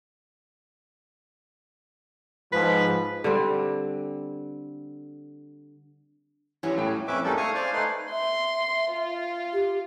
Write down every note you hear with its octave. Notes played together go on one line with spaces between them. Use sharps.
G#2 F3 B4
D3 G3 C4
E3 F#3 G3 C#4
A2 G5
F2 C#4 B4 E5 D6
G3 G#3 A#3 C#4 D#4 A4
A3 F5 G#5 C#6 D#6
C5 D5 F5 G#5
A3 D#4 B4 C6
E5 C6
F4
G4